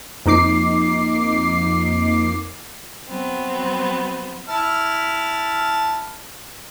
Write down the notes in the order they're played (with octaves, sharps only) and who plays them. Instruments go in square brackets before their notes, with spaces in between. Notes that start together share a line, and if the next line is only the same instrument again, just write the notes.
[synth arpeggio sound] F2 A#3 D#4 D6 C7
[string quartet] F#3 B3 C4
[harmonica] E4 A5 F6